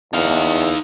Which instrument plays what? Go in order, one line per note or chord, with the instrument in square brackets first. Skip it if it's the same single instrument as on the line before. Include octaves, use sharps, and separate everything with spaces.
[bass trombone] E2 [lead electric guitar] D#4 F5